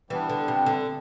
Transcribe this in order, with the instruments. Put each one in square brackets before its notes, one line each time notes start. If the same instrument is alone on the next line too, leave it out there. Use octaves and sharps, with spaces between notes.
[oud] E3 [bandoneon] G3 B3 D4
[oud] D3
C3
D3